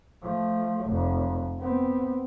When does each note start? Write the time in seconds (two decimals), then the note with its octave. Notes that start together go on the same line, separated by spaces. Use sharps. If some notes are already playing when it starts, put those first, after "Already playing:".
0.22 F3 A3
0.85 F1 F2
1.60 B3 C4